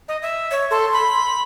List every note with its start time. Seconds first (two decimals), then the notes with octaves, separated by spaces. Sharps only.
0.08 D#5
0.22 E5
0.51 C#5
0.71 A4 C6
0.93 B5